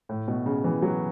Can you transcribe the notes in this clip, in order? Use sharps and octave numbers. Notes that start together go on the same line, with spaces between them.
A2
B2
C#3
E3
F#3